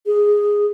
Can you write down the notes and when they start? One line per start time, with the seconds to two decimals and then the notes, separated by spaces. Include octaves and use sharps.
0.06 G#4